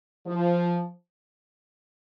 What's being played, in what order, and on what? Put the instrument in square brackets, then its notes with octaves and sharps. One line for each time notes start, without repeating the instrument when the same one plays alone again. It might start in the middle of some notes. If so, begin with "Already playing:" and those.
[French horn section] F3